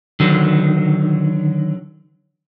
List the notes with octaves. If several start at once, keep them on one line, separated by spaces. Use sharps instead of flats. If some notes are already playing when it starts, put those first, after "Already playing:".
D3 D#3 F#3